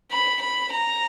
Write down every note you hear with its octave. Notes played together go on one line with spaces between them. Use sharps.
B5
B5
A#5